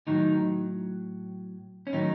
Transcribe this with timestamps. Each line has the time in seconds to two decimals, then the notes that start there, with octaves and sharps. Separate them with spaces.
0.07 A2 D#3 F#3 D#4
1.87 C#4
1.93 A2 D#3 F#3 D#4